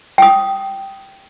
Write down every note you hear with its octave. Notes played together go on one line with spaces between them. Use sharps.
G5 D#6